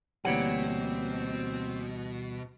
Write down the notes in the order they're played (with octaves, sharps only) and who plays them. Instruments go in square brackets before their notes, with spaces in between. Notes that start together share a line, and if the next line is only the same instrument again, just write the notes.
[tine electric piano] D2 E3 G3 [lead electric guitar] B2 [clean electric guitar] A#3 C#5 F#5 [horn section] C4